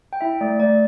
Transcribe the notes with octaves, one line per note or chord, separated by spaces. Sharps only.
G5
E4 E5
A3 D5
A3 D5